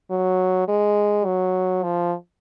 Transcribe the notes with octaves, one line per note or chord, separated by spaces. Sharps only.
F#3
G#3
F#3
F3